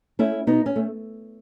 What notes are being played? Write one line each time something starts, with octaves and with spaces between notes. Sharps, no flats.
A3 C#4 E4
B2 B3 D#4
C#4
A3